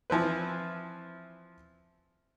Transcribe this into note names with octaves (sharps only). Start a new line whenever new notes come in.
E3 F3 C4 B4